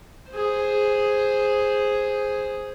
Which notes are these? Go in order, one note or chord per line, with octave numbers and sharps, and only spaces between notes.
G#4 C5